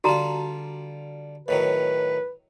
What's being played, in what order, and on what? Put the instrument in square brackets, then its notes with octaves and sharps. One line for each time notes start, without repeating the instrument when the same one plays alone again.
[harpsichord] D3 G3 F4 [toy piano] F#4 A5 A#5
[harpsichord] A2 D#3 F#3 [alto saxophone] B4